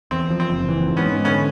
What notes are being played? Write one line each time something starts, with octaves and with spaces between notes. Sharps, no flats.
E2 C4
F3
C4
F#1
E3
G#2
B3 C#4
G#2
D3 B3 C#4